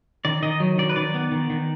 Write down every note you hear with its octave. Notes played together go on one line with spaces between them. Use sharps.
D#3 D5
D#3 D#5
F#3
D#3 D5
B4
D#3 D5
B3
D#3
D#3